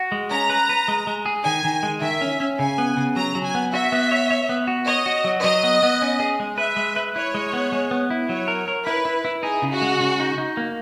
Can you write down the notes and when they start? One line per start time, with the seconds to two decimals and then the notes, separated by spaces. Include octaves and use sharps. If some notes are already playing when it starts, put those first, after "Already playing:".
Already playing: F#4
0.12 G#3
0.30 C#4 A#5
0.50 B4
0.69 B4
0.88 G#3
1.07 G#3
1.26 G#4
1.45 D#3 G#5
1.64 D#3
1.83 G#3
2.01 D#3 E5
2.21 C#4
2.40 C#4
2.59 C#3 G#5
2.78 B3
2.97 C#3
3.16 F#3 A#5
3.35 F#3
3.44 G#5
3.55 B3
3.73 F#4 E5
3.92 B3
4.11 C#5
4.31 C#5
4.49 B3
4.67 F#4
4.87 C#5 D#5
5.06 F#4
5.24 F#3
5.43 F#3 D#5
5.63 B3
5.83 B3
6.02 C#4
6.20 G#4
6.40 G#3
6.58 B4 E5
6.77 G#3
6.96 B4
7.15 E4 C#5
7.34 G#3
7.53 B3
7.72 G#3
7.91 B3
8.10 E4
8.29 F#3 C#5
8.48 A#4
8.68 A#4
8.86 E4 B4
9.05 E4
9.25 E4
9.43 D#4 G#4
9.62 C#3
9.71 F#4
9.82 G#3
10.01 C#3
10.20 D#4
10.38 D#4
10.57 A#3